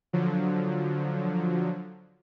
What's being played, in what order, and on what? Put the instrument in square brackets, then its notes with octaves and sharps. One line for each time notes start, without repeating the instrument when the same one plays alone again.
[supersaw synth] D3 F3 F#3